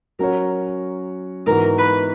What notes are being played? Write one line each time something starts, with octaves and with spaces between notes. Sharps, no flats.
F#3 C#4 F#4 A#4 C#5
G#2 E3 B3 F#4 A#4
B4